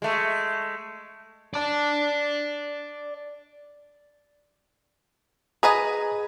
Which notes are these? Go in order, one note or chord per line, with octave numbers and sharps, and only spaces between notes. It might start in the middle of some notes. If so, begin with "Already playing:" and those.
G#3 A3
D5 A5
G#4 B4 D#5 A#5